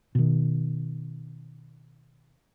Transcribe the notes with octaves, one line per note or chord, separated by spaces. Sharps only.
B2 D#3